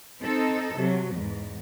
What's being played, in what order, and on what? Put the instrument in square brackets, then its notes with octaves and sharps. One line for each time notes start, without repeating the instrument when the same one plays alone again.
[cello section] C4 D#4 A4
C3 F#3
E2 G#2